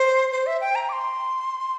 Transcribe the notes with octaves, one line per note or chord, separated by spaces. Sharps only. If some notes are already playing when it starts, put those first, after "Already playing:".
Already playing: C5
C5
E5
G5
A#5
D6
C6